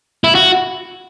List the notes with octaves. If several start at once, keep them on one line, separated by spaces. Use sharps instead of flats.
E4
F#4